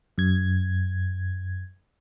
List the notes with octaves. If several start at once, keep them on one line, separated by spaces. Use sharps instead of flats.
F#2 G#6